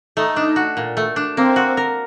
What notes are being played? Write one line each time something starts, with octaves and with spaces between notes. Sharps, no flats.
A3 D#4
D4
F#4
A#2
A3
D4
A#3 C4
F#4
A#4